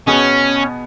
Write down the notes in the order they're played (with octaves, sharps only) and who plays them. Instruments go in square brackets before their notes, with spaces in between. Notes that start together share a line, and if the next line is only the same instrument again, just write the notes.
[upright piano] B2 B3 G#4 [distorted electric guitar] C#4